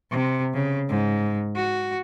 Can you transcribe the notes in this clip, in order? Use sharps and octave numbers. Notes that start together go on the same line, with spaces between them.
C3
C#3
G#2
F#4